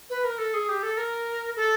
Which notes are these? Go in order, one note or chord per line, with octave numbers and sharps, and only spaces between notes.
B4
A#4
A4
G#4
G4
A4
A#4
A4